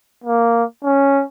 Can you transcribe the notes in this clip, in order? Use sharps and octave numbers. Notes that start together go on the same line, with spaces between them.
A#3
C#4